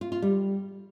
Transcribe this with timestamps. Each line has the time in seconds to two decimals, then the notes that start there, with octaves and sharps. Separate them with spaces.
0.01 F4
0.12 F4
0.22 G3